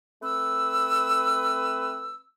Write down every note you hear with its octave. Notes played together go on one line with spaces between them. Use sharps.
A3 C4 B4 E6